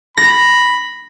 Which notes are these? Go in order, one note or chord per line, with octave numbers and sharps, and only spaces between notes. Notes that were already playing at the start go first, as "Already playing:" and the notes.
B5 A#6